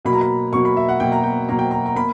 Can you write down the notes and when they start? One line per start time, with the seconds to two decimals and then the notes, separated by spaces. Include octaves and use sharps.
0.05 B2 F#3 A#3 B5
0.13 A#5
0.21 B5
0.53 B2 F#3 A#3 C#6
0.65 B5
0.77 E5
0.89 F#5
1.00 B2 F#3 A#3 G5
1.12 A#5
1.23 G5
1.49 B2 F#3 A#3 A#5
1.59 G5
1.71 A#5
1.86 A#5
1.96 A#3 B5